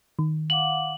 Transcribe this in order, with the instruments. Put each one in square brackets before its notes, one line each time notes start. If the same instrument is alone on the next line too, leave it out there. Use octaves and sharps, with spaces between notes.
[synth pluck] D#3
[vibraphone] F5 F#5 D6 [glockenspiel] F#7